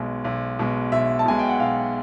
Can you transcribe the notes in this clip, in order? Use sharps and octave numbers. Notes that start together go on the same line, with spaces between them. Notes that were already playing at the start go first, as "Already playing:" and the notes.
Already playing: B1 B2 G#3
B1
B2 G#3
B1 E5
A5
B2 G#3 G#5
G5
F#5
B1 F5